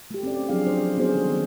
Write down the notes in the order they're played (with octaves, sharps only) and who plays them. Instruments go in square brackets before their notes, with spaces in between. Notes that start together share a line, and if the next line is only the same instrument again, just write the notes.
[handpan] A3 G4
C4 C#4 D5
F3 F#3 C4 D4 G#4 F5
C5
A3 B3 C#4 F#4 G#4 C5
D#3 G3